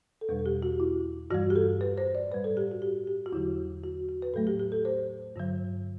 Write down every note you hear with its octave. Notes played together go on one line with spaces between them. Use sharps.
A4
E2 B2 G3 B4
A4
G4
F#4
E4
G2 E3 G3 F#4
G4
A4
B4
C5
D5
A2 G3 B4
A4
G4
F#4
G4
G4
F#4
E2 D3 F#3 E4
F#4
F#4
B4
A2 F#3 A3 A4
G4
G4
A4
C5
G2 D3 F#3